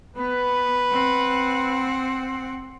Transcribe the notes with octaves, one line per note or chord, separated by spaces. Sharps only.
B3 B4
C4 F#5